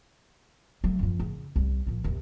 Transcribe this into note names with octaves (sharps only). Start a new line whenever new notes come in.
F#3 A3
F#2 F3
C#3
C2
A#2 F3
D#2 C3